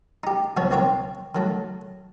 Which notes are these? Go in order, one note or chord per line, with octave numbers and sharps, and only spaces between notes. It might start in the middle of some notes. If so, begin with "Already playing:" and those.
D#4 G4
C#2 B2 F3 B3 F#4 C#5
B1 A#3 C4 C#5 G5
D#3 F#3 A3